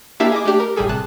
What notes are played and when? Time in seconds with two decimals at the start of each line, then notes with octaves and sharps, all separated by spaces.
0.20 A#3 D4 E4 G4 E5 F5
0.32 G#4 D#5 D6
0.45 A3 D4 G4
0.60 A#4
0.76 G1 A2 G3 G#4 A4
0.89 C3 A5 F#6